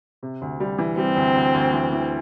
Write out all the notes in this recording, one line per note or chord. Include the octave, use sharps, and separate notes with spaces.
C3
D2
G3
E3
G3 C4
D2
D2
D2
E3
E3